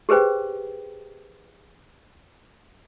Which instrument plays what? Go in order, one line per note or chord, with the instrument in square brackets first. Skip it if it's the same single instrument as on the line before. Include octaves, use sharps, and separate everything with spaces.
[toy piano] G4 G#4 B4 C5 G5